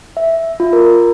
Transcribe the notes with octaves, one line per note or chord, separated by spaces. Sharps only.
E5
F4
A#4